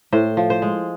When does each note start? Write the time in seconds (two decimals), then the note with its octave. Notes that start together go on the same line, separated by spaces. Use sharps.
0.13 A2 C5
0.37 F3
0.50 C5
0.62 G#3